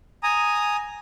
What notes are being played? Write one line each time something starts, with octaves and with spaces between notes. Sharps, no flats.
G#5 A#5 D#6